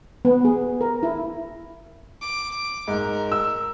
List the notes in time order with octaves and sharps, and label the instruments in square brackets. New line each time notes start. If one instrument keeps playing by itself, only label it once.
[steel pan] B3
G#4
A#4
E4
[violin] D6
[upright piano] G#2 [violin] A#4
[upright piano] E6